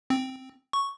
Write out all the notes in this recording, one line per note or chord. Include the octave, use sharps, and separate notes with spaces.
C4
C#6